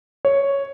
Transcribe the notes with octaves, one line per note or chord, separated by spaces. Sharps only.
C#5